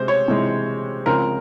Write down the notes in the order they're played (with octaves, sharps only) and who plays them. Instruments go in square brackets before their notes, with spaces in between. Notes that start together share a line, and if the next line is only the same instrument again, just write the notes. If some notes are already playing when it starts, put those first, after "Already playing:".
Already playing: [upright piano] C3 G#3 [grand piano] C5
[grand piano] C#5
[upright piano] C3 E3 G#3
[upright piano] C#2 C#3 F3 C4 [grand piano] A#4